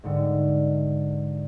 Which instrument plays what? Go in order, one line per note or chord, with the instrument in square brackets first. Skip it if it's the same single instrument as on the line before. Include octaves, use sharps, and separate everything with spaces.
[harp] G#2 D3